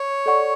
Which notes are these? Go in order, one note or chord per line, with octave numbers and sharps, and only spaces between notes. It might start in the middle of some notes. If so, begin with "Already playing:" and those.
Already playing: C#5
A4 D5 F#5 C#6